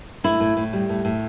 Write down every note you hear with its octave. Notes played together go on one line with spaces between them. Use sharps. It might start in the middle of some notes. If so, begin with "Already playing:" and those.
A2 E4
A2
A2
G3
A2
A2